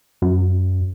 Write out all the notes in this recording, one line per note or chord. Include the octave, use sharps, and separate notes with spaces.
F#2